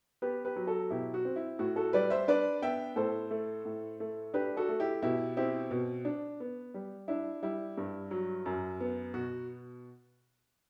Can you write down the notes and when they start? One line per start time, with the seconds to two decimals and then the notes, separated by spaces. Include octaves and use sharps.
0.22 B3 G4 B4
0.45 G4 B4
0.56 F#3
0.67 F#4 A4
0.90 B2 E4 G4
1.14 F#4
1.25 C4
1.36 E4
1.59 A2 F#4
1.76 F#4 A4
1.93 G3 B4 D5
2.10 C5 E5
2.28 D4 B4 D5
2.62 B3 E5 G5
2.96 A2 A4 C5
3.31 A3
3.65 A2
4.00 A3
4.34 D4 G4 B4
4.57 F#4 A4
4.69 A3
4.80 E4 G4
5.02 B2 E4 G4
5.37 C4 E4 G4
5.71 B2
6.05 D4
6.40 B3
6.74 G3
7.08 D4 E4
7.43 G3 E4
7.78 G2
8.11 F#3
8.46 F#2
8.80 B3
9.14 B2 F#4